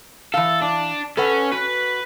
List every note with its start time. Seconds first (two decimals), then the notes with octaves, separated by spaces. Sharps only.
0.34 E3 A4 F5
0.62 D4
1.17 C#4 A4 B4 F#5
1.52 F#4 B4